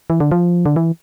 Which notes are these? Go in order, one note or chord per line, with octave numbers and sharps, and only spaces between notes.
E3
D3
F3
D3
E3